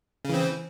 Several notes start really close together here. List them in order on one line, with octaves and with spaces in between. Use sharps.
C#3 E3 C4